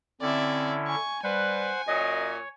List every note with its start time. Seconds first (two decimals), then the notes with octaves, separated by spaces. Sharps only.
0.22 D3 C4 C#4 E4 D5 E5
0.88 G#5 C#6
1.23 G3 B4 C5 F#5 G#5
1.88 F#2 A#2 C#5 D#5